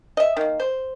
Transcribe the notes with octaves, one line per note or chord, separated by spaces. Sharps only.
D#5 E5
D#3 A#3
C5